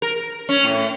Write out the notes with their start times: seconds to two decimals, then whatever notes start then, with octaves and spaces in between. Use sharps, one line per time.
0.02 A#4
0.49 C#4
0.64 A2